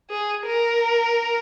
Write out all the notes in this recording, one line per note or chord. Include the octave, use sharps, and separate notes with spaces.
G#4
A#4